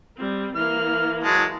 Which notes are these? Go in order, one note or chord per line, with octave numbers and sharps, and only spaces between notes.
G3 C4
E3 A#3 F6
F#3 G#3 A5